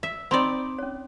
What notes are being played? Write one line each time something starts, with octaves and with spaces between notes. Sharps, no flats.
E5
C4 D#4 D5 B5 C6
C#4 C#5